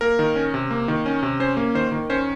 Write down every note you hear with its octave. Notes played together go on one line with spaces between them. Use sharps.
A#3 A#4
D#3
C#4
C3
A#3
D#3
C#4
C3
C#4 C5
A#3
D#3 C5
D#3
C#4 C5